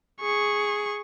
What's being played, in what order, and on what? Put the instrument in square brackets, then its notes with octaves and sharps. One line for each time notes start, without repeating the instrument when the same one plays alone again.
[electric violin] G#4 C#6